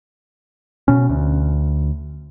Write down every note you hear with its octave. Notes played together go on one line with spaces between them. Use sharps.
B2 C#4
D2